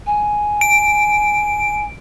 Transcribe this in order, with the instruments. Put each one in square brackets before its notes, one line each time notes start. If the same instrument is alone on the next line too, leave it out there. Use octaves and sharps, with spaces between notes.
[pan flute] G#5
[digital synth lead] D7